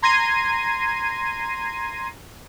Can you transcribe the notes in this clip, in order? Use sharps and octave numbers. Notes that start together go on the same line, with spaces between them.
A#5 C6 G#6 A#6 C7 D#7